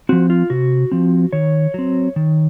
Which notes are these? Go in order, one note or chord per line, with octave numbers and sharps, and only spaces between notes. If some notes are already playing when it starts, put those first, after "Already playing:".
F3 C4 F#4
F4
C3 F#4
F3 C4
D#3 C#5
F#3 C4
D#3